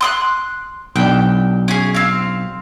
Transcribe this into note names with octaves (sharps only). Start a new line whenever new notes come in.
C6 D#6 F#6
B1 D4 G5
C#4 G#4
C4 F5